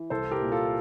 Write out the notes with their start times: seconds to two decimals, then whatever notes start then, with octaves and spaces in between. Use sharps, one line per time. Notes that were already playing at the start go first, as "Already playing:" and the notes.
Already playing: E3
0.10 C2 A4 C5
0.31 G4 A#4
0.41 A#2
0.52 F4 A4